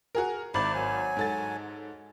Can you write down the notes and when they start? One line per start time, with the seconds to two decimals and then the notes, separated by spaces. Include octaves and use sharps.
0.15 F#4 G#4 A#4
0.54 G#1 E4 D5 F#7
0.75 F#3 G#5
1.17 G#2 A4 A6